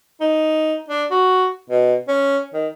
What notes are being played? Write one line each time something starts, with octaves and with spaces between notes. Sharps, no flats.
D#4
D4
F#4
B2
C#4
D#3